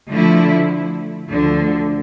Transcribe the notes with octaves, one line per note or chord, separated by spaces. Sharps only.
D3 F3 A3 E4
D2 D3 F3